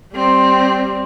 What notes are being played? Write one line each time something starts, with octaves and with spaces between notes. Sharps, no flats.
G3 C4